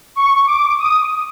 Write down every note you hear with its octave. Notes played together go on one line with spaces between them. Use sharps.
C#6
D6
D#6